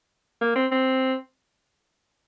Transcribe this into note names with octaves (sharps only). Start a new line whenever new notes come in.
A#3
C4
C4